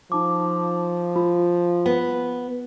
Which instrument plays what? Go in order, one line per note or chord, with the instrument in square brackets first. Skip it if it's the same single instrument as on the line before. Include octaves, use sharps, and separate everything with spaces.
[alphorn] F3 [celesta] D#4 A5 D6
[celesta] F4
[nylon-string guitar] B3